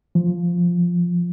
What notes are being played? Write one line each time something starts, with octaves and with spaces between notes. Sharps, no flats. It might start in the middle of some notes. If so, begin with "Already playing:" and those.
F3